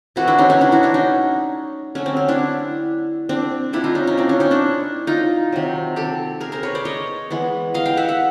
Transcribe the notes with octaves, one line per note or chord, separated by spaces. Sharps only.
C3 E3 A3 E4 F#4
D4 E4
C#4 D#4
C#4 D#4
D4 E4
E4 F#4
D4 E4
C#4 D#4
D3 F#3 A3 C#4
C4
C#4
D4 E4
C4 D4
C3 F3 A#3 D4 E4
D#4 F4
C#4 D#4
C#4 D#4
C4 D4
C#4
C#4 D#4
D4 E4
D#4 F4
C3 D#3 F#3
G4 A4
G#4 A#4
A#4 C5
B4 C#5
C5 D5
C#5 D#5
E3 G#3 B3
D#5 F5
F5 G5
E5 F#5
E5 F#5